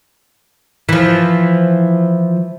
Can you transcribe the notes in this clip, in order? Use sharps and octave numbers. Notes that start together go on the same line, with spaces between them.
E3 F3